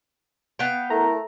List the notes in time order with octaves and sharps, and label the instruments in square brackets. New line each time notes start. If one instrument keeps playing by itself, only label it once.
[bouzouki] B3 F5 G5
[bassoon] A3 [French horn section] E4 A4 A#4 [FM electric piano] A#5